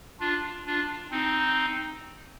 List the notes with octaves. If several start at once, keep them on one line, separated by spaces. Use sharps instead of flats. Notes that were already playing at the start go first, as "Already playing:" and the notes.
D4 F4
D4 F4
C4 D#4